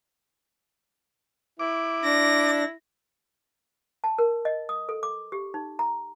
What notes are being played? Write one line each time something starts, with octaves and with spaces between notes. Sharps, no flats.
E4 D6
D4 A#6
A5
A#4
D#5
D#6
A4
D6
G4
D#4
A#5